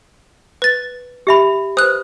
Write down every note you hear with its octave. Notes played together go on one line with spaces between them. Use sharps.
B4 A6
G4 E5 B5
B4 C5 D#6 F#6